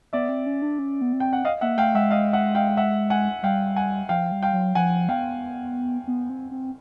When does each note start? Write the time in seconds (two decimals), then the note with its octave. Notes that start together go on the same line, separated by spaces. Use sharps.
0.13 B3 D5 E5
0.29 C4
0.46 C#4
0.62 D4
0.79 C#4
1.01 B3
1.13 C4
1.20 G5
1.33 F#5
1.45 D#5 F5
1.61 A#3 E5 F#5
1.78 A3 F5 G5
1.94 G#3 E5 F#5
2.11 D#5 F5
2.33 E5 F#5
2.55 F5 G5
2.77 E5 F#5
3.10 F#5 G#5
3.43 G3 F5 G5
3.76 F#5 G#5
4.09 F3 F5 G5
4.32 G3
4.43 F5 G5
4.53 F#3
4.75 F3 F#5 G#5
5.09 B3 F5 G5
6.07 B3
6.30 C4
6.51 C4